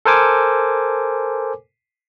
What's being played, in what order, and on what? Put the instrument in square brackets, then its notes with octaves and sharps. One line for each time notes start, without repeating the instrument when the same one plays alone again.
[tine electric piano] A4 A#4 C5 G#5 D6